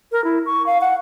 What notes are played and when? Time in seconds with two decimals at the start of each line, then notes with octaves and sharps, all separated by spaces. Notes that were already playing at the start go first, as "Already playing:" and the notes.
0.12 A#4
0.24 E4
0.46 C#6
0.66 F5
0.81 F#5